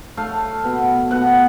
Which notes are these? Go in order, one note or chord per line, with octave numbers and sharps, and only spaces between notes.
A3 F5
B2
B2 F#5